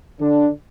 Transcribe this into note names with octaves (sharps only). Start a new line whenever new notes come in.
D3 D4